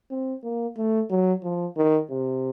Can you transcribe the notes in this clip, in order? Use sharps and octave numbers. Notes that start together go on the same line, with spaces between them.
C4
A#3
A3
F#3
F3
D#3
C3